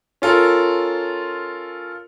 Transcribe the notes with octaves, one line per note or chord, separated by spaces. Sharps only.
C#4 F4 A4 A#4